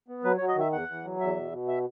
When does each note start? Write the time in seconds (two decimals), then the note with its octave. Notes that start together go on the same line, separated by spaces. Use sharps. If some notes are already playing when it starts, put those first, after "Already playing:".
0.08 B3
0.24 F#3 B4
0.37 C#5
0.41 F#3
0.48 D#5
0.56 D#3 E5
0.72 E2 F#5
0.88 E2
1.05 F#3
1.20 E2 E5
1.36 B2
1.52 B2
1.68 E5